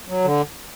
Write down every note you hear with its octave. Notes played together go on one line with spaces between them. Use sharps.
F#3
D3